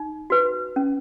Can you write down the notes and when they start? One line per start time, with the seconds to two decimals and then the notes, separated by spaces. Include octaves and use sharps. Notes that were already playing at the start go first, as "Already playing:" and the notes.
Already playing: D#4
0.30 F#4 B4
0.76 C#4